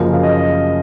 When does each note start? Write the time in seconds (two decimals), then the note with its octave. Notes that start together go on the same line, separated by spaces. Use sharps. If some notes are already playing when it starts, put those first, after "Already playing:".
Already playing: F#1 F#2 C#3 F3 A#4
0.13 F5
0.23 D#5